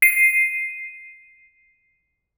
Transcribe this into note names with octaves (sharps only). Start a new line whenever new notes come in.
C7 D#7